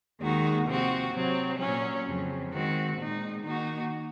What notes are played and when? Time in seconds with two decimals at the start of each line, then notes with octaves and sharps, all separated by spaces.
0.21 D#2 D#3 G#3 D#4 F#4
0.67 C3 F3 C4 F#4
1.13 C3 F#3 C4
1.59 A#2 F#3 C#4
2.05 F2 C#3 F#3
2.51 D#3 G#3 C4 F#4
2.98 A#2 G#3 D#4
3.44 D#3 A#3 D#4 F#4